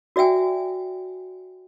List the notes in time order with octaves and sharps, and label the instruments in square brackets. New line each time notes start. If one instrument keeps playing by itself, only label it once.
[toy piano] F#4 D5 E5 G5 G#5